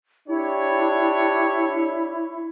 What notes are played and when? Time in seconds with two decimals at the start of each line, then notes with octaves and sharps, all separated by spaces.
0.28 D4 E4 G4 C#5